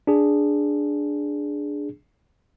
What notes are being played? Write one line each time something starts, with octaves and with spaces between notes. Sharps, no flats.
D4 G#4